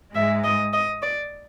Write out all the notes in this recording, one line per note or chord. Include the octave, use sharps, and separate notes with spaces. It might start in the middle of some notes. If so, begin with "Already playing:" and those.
G#2 G#3 E5
D#5
D#5
D5